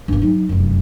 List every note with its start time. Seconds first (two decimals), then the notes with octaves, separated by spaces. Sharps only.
0.08 G2 A#3
0.22 F#3 D#4
0.49 F1 F#2